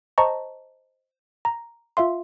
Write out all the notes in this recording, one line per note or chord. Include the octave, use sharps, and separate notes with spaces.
C5 D#5 A5 A#5 C#6
A#5
F4 E5 F5 C6